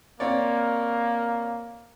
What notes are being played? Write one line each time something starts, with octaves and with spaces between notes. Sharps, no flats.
A#3 C4 C#5 D5